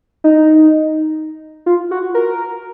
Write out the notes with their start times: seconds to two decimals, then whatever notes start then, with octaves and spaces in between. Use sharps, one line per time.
0.24 D#4
1.66 F4
1.91 F#4
2.15 A#4